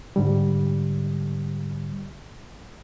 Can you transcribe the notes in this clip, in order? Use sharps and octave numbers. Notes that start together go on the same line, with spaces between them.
G#2 D3 G3